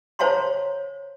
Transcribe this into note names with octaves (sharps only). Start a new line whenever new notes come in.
C5 C#5 F5 A5 A#5 C6